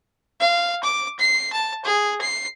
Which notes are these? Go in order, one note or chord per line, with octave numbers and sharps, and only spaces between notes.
F5
D6
C7
A5
G#4
C7